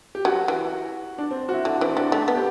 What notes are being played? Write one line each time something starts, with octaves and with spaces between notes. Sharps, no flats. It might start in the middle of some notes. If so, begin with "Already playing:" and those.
G4
F#3 F#4
E3
D4
C4
F#4
E4
D3 D4
E3 C4
G3 D4
A3 D4
B3
G4